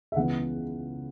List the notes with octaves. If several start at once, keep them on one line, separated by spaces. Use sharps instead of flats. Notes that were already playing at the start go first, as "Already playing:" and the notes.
E5
C#2 C#3 E3 B3 F#5